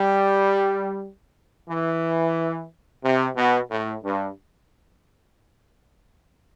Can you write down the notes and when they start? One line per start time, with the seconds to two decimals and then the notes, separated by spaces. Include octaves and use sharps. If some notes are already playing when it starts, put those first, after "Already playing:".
Already playing: G3
1.69 E3
3.04 C3
3.37 B2
3.71 A2
4.04 G2